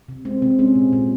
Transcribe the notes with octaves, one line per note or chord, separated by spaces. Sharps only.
C3
G#3 C4
C3 C4
G#3 C#4
A#2
A#2